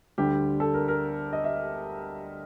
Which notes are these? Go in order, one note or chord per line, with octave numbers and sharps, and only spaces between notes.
D2 D3 G3 G4
A4
A#4
A#4
D#5
E5